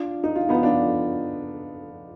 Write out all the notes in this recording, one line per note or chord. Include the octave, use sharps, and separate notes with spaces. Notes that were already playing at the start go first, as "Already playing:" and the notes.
Already playing: D4 F4
D#4
F4
B3 D#4
D4 F4